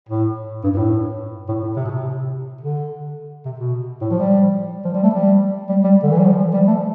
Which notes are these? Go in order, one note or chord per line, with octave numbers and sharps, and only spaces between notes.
A2
G2
G2
A2
A2
A2
C3
B2
C3
D3
C3
B2
A2
F3
G3
F3
G3
A3
G3
G3
G3
D3
E3
G3
F3
G3
A3